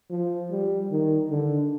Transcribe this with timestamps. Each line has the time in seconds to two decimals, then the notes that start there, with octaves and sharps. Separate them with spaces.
0.11 F3
0.51 G3
0.91 D#3
1.31 D3